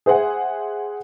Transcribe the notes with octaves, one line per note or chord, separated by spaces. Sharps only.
G#4 C5 E5 F#5 G#5